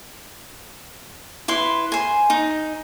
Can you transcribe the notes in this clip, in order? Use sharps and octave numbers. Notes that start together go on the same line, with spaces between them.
E4 B4 C6
C5 G#5
D#4